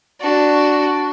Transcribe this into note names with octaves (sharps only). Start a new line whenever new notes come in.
D4 F#4